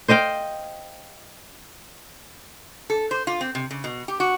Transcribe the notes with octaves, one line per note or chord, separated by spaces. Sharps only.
C5 D#5 F5 G5
A4
C5
F4
C4
C3
C#3
B2
G4
F#4